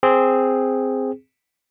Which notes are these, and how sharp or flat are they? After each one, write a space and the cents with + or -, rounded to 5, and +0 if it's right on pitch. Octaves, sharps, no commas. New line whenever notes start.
C4 -5 G#4 -5